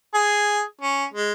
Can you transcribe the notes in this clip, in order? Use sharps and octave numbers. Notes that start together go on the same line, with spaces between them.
G#4
C#4
G#3